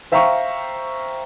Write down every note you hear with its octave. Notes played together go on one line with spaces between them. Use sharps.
C5 E5 F5 G5 A#5 C#6